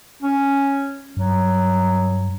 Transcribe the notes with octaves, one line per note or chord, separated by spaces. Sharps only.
C#4
G2 F#3